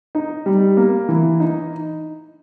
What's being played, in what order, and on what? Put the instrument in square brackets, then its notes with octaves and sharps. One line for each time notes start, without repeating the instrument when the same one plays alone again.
[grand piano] D#4
G3
A#3
E3
D#4